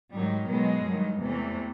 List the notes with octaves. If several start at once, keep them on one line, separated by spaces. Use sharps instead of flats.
G#2 D#3 F#3 G3
B2 F#3 G#3
G2 D#3 F#3
E2 C3 E3 A3